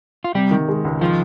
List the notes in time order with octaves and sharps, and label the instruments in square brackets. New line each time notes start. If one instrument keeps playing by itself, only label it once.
[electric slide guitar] F4
[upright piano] C3 [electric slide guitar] G3 G4
[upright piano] D#3
G#3
C#2
[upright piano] D#3 [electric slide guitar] F3 F4